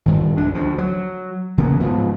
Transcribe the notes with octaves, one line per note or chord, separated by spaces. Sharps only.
G2 D#3
C#2 D4
D2 F3
F#3
C#3 F3 A#3 B3
G#2 F3 B3